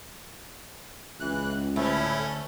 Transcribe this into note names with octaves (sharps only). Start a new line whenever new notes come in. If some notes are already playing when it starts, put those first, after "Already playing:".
C#2 E3 F#6
D2 A2 A3 C#4 E4